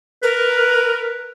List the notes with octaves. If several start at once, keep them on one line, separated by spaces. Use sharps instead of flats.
A#4 B4